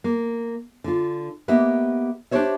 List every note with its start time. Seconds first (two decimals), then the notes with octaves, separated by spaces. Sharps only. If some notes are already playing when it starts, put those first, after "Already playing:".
0.04 A#3
0.84 D3 F4
1.48 A#3 B3 G4 D#5 E5
2.31 D4 G4 G#4 C5 C#5 E5